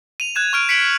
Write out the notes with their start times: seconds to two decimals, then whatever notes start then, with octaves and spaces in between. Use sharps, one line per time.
0.20 D#7 F7
0.35 F#6 G#6 E7
0.53 C#6 F6 D7
0.69 B6 C#7 D7 F#7